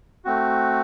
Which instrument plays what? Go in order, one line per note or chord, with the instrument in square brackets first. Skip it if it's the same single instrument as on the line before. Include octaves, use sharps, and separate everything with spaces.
[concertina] A3 C4 F#4